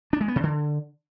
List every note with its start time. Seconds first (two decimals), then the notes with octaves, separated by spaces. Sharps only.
0.13 D4
0.21 G#3
0.28 B3
0.36 C3
0.43 D3